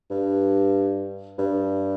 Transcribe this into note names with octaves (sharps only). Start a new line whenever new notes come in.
G2
G2